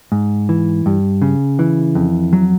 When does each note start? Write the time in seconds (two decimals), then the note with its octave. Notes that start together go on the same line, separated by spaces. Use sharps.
0.12 G#2
0.49 E3
0.86 G2
1.22 C#3
1.59 E3
1.95 F2
2.33 F#3